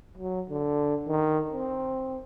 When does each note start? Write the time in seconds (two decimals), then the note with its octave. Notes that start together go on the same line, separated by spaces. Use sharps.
0.17 F#3
0.50 D3
1.07 D#3
1.52 C4